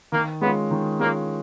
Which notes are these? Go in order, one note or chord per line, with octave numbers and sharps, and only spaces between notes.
D#3 A#3
G#3 B3 C#4 F4
D#3
G#3 A#3 C#4 F4